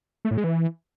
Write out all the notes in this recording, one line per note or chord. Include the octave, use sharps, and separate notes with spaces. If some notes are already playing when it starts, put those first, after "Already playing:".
A3
A2
G#3
E3